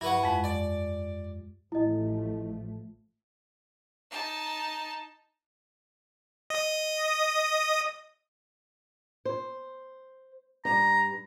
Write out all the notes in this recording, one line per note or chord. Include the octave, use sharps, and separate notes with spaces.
G2 E4 B4 F#5 C#6
F2 G#3 F5
D5
A1 F3 A3 E4 D#5
D#4 A5
D#5 D#6
C5
G2 A#5